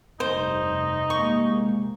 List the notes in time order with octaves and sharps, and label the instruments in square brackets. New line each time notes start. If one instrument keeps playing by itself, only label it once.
[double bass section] F1 G2 [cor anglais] D#4 [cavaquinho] C5
[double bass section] C3 G#3 A#3 [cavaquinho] C#6